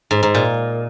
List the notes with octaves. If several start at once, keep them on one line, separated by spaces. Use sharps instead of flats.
G#2
G#2
A#2